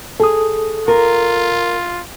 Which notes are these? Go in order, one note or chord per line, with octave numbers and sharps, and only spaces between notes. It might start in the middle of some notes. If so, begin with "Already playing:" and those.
G#4 A4 D#6
F4 A#4